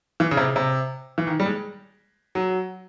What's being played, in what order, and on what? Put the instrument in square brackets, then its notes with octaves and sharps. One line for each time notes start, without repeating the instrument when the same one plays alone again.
[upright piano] E3
C#3
C3
C3
E3
D#3
G3
G#3
F#3